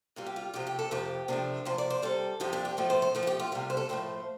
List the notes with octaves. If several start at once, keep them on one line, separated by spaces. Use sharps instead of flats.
C3 G3 F4
G4
F4
C3 F3 A3 G4
G4
A4
F2 C3 F3 A3 G4
C3 F3 A3 D4
C3 F3 A3 C5
D5
C5
C3 G3 A4
F2 C3 F3 G4
D4
G4
A2 F3 A3 A4
C5
C5
F2 F3 A3 A4
F4
G4
F4
C3 G3 F4
C5
A4
A2 F3 A3 C5